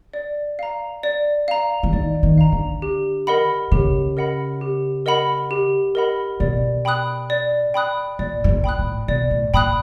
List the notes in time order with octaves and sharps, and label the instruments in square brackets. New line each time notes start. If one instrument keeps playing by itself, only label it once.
[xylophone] D5
F5 A#5
D5
F5 A#5
[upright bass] E3
[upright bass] D#3 [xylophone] D5
[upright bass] D#3
[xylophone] F5 A#5
[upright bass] D3
[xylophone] G4
A#4 D#5 F#5 B5
[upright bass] C#3 [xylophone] G4
[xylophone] A#4 D#5 F#5 B5
G4
A#4 D#5 F#5 B5
G4
A#4 D#5 F#5 B5
[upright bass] B2 [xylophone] D5
[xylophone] G5 B5 D#6 F#6
D5
G5 B5 D#6 F#6
[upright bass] A#2 [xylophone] D5
[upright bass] A2
A#2
[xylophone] G5 B5 D#6 F#6
[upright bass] A2
[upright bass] B2 [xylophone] D5
[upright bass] A2
[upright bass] A#2 [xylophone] G5 B5 D#6 F#6